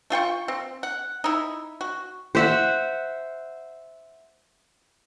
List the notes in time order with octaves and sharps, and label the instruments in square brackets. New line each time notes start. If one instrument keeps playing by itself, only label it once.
[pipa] A3 F4 G5 C#6
C4
F#5
D#4 E4
F#4
[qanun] C5 E5 F#5